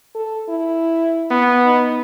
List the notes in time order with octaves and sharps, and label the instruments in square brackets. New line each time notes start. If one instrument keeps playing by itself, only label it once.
[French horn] A4
E4
[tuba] B3
[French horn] D#4